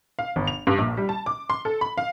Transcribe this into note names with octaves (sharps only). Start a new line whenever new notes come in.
F5
G1
F7
G2
A#1
G3
A5
D6
C6
A4
B5
F5